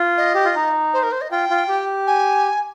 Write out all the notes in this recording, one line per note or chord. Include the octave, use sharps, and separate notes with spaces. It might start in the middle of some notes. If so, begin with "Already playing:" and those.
Already playing: F4
D#5
G4
F4
D#4
C5
A#4
C5
D#5
F4 G5
F4
G4
G#5